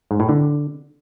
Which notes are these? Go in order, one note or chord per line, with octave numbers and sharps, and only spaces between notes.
G#2
A2
D3